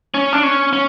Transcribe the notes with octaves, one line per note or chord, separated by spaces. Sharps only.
C#4
D4
C#4
C#4